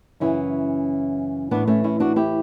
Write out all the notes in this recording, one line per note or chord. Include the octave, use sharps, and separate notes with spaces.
F#2 C#3 E3 C#4 E4
A2 E3 B3 D4
A3 C#4
C#4 E4
D4 F#4
E4 G4